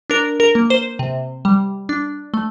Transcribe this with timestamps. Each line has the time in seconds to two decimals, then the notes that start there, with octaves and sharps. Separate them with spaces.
0.10 D4 A#4
0.40 A#4
0.55 A#3
0.70 C5
0.99 C3
1.45 G3
1.89 D4
2.34 A3